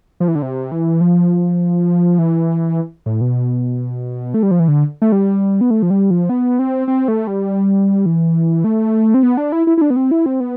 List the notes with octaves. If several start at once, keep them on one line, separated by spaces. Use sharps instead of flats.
F3
E3
D3
C3
E3
F3
E3
A2
B2
A3
G3
F3
E3
D3
A3
G3
B3
A3
F3
G3
F3
B3
C4
C4
A3
G3
E3
A3
C4
B3
D4
E4
E4
E4
D4
B3
C4
E4
C4
B3